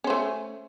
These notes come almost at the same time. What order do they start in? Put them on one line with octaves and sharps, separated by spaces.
C#4 C5 A3